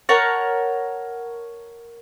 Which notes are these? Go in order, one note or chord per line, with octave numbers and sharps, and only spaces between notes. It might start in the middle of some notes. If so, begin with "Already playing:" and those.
A#4 C#5 F#5 A5